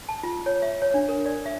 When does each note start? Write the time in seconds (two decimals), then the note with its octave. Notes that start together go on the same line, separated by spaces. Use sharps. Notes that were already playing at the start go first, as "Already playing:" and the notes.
0.09 A5
0.23 F4
0.46 C#5
0.62 E5
0.82 C#5
0.94 D4
1.09 A#4
1.26 D5
1.46 E5